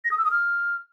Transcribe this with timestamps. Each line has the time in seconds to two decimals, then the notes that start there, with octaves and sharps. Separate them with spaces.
0.05 A#6
0.11 D#6
0.18 E6
0.25 D#6
0.31 F6